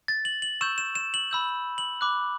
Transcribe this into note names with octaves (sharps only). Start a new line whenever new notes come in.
A6
F#7
F#7
C#6 E6 G6 E7
E7
E7
F#7
B5 E6 G6
F#7
B5 D6 F#6